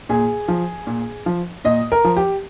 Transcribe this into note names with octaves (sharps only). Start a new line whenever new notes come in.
A#2 G#4
F3
A#2
F3
A#2 D#5
A#4
F3
G4